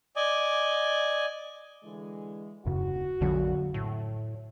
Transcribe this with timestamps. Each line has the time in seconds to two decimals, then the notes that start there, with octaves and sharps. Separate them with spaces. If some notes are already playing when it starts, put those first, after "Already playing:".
0.16 D5 D#5 G#5
1.84 D3 E3 G#3
2.66 D#1 F#2 C#3 F#4
3.21 A#1 F2 D3 F#3
3.74 A2